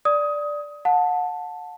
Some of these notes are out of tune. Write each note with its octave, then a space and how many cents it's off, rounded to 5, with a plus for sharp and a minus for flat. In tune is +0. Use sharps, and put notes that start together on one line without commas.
D5 +0 D#6 +20
F#5 -30 A5 +0